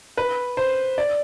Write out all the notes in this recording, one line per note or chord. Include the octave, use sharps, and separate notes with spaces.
B4
C5
D5